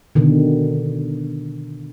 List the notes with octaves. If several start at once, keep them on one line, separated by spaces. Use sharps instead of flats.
B2 D3 D#3